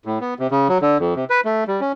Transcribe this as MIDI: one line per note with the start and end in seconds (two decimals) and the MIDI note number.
0.05 0.19 45
0.21 0.34 59
0.39 0.47 48
0.51 0.68 49
0.69 0.78 54
0.81 0.98 50
1.00 1.14 41
1.16 1.25 48
1.30 1.41 71
1.45 1.64 57
1.68 1.81 55
1.81 1.92 61